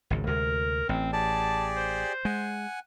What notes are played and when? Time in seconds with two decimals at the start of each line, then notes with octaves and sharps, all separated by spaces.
0.10 G#1 C#2
0.27 D2 C3 G#3 A#4
0.89 A1 C4
1.13 G4 G#4 D5 A5
1.76 C5
2.25 G#3 F#5 G#5